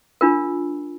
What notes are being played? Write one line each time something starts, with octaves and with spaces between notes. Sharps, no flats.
D4 F4 A#4